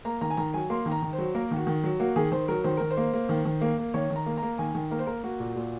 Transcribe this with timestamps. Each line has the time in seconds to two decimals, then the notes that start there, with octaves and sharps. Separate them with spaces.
0.05 A#3 A#5
0.21 D#3 A#5
0.30 G#5
0.37 D#3 A#5
0.54 F#3 G#5
0.70 A#3 C6
0.86 D#3
0.92 A#5
1.02 D#3
1.13 C5
1.18 F#3
1.35 A#3 A#4
1.51 D#3
1.56 F#4
1.67 D#3
1.83 F#3
2.00 A#3 F#4
2.16 D#3 G#4
2.32 D#3 C5
2.48 F#3 A#4
2.64 D#3 C5
2.77 D#3 A#4
2.91 C5
2.97 A#3
3.13 A#3
3.29 D#3
3.45 D#3
3.61 A#3
3.78 A#3
3.94 D#3 C#5
4.10 D#3
4.16 A#5
4.26 A#3
4.37 A#5
4.43 A#3
4.58 D#3 G#5
4.75 D#3
4.91 A#3 A#4
4.99 C5
5.07 A#3 A#4
5.23 A#3 F#4
5.40 A#2
5.56 A#2